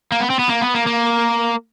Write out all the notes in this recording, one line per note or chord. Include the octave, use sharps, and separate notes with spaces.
A#3
B3
C4
B3
A#3
B3
A#3
A#3